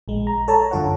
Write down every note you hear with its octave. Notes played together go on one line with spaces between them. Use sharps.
A#1 G#3
A#5
A4 C#5 A5 A#5
F#2 D3 F4 C#5 F#5